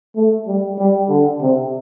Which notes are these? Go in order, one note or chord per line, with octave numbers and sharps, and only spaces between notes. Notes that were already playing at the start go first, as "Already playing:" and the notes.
A3
G3
G3
D3
C3